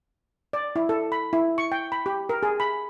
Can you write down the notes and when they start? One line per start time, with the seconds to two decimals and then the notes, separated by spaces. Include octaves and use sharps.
0.53 D5
0.76 E4
0.89 A4
1.12 B5
1.33 E4
1.58 C#6
1.72 G5
1.92 B5
2.06 G4
2.29 A#4
2.43 G#4
2.60 B5